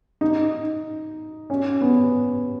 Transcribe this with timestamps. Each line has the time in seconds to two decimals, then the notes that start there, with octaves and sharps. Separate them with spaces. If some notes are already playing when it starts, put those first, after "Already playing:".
0.21 D#4
1.50 C#4
1.81 B3